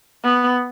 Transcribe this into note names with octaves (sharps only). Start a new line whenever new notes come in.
B3